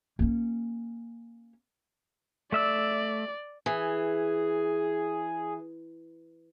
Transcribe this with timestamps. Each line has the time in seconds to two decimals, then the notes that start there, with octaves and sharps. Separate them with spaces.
0.19 A#3 C#4
2.52 A3 D5 E5 E6
3.66 E3 G#4